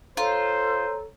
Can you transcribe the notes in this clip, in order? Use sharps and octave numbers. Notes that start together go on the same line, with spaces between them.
F4 A4 C5 C#5 A#5